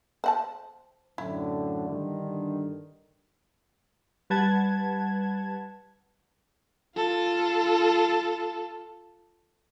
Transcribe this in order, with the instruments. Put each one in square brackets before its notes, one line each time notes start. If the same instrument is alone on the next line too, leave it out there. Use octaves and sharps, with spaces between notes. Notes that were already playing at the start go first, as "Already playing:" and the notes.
[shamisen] C5 F#5 A5
[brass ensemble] F#2 A2 D3 [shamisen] E4
[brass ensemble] G2 D3 D#3
[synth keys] G3 B4 F#5 A5 G#6
[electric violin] F4 A4